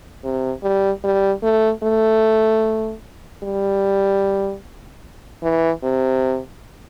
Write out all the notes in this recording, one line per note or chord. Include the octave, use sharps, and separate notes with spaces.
C3
G3
G3
A3
A3
G3
E3
C3